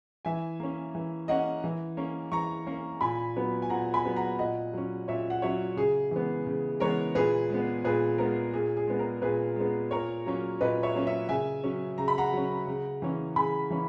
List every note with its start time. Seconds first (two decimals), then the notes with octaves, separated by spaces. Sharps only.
0.25 E3 E5 G#5
0.60 A#3 C#4
0.95 E3
1.28 A#3 C#4 D#5 F#5
1.64 E3
1.97 A#3 C#4
2.32 E3 A#5 C#6
2.66 A#3 C#4
3.01 A#2 G#5 B5
3.36 F#3 B3
3.62 G#5
3.70 A#2 F#5 A#5
3.94 G#5 B5
4.05 F#3 B3
4.16 F#5 A#5
4.39 A#2 D#5 F#5
4.73 F#3 C#4
5.08 A#2 C#5 E5
5.30 F#5
5.42 F#3 C#4 C#5 E5
5.77 C#3 G#4
6.11 E3 G#3 B3
6.46 C#3
6.80 E3 G#3 B3 A#4 C#5
7.15 A#2 G#4 B4
7.50 G#3 B3
7.84 A#2 G#4 B4
8.18 G#3 B3 A#4
8.53 A#2 G#4
8.77 G#4
8.88 G#3 B3
8.99 A#4
9.22 A#2 G#4 B4
9.56 G#3 B3
9.91 A#2 A#4 C#5
10.26 F#3 A#3 C#4
10.61 A#2 B4 D#5
10.83 C#5 E5
10.95 F#3 A#3 C#4
11.07 C#5 E5
11.29 C#3 E5 G#5
11.64 F#3 C#4
11.98 C#3 A#5
12.08 B5
12.18 F#5 A#5
12.33 F#3 C#4
12.67 C#3
13.02 E3 A#3 C#4
13.36 C#3 G#5 B5
13.70 E3 A#3 C#4